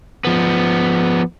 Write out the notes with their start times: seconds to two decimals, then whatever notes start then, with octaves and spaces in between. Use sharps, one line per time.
0.25 F3 B3